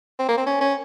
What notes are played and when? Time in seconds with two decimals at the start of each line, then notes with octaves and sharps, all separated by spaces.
0.19 C4
0.29 A#3
0.37 C4
0.47 C#4
0.61 C#4